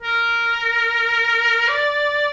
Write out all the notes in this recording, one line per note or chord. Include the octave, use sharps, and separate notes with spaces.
A#4
D5